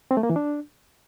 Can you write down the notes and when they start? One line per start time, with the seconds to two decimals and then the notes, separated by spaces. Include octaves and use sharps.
0.11 C4
0.17 A3
0.23 A#3
0.30 E3
0.36 D4